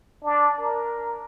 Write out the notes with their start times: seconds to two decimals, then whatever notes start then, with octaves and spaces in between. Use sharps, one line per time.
0.24 D4
0.60 A#4